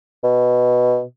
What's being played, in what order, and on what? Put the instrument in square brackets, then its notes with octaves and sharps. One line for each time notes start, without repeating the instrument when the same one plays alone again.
[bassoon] B2